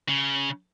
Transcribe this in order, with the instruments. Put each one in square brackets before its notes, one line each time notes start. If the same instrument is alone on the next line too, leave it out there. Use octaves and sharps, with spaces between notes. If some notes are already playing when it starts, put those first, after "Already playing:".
[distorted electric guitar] C#3